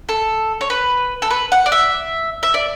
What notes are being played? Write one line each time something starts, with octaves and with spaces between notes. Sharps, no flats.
A4
C#5
B4
A4
B4
F#5
D5
E5
E5
D5